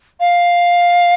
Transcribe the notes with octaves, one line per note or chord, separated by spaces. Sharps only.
F5